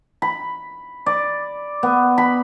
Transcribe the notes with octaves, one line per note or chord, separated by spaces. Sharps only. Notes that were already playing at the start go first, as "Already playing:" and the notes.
B5
D5
B3
B5